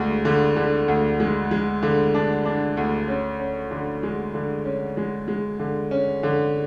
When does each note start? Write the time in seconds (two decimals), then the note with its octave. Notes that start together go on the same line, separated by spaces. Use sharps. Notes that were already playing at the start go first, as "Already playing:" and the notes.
Already playing: D2 G#3
0.25 D3
0.56 D3
0.88 D2
1.20 G#3
1.51 G#3
1.83 D3
2.14 D4
2.45 D4
2.77 D2
3.08 C#4
3.40 C#4
3.71 D3
4.03 G#3
4.34 D3
4.65 C#4
4.97 G#3
5.28 G#3
5.59 D3
5.91 C#4
6.23 D3